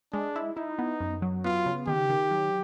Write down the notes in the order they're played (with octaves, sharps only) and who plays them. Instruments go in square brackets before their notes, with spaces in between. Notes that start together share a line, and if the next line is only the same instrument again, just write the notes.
[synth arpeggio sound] G#3 [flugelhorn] D4
[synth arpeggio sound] E4
[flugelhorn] D#4 [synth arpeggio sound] E4
[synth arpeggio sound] B3
F#2
F#3
[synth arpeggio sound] B3 [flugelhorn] F4
[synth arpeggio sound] C#3
[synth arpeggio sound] D#3 [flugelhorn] G4
[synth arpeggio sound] D#3
F#3